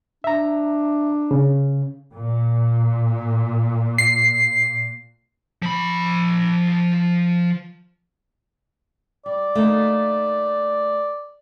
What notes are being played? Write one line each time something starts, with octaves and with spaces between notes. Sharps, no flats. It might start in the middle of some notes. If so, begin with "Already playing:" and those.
D4 E5 A#5
C#3
A#2
C7
F3 B5
G3 D5
A3 A#3 D#4